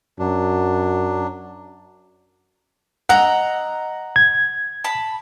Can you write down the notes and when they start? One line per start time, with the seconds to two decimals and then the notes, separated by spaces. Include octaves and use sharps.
0.19 F#2 F#3 D4
3.09 D#5 F#5 A#5 E6
4.16 G#6
4.84 A5 B5